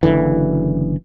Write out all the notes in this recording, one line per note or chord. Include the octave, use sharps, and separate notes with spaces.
F#1 D2 D3 E3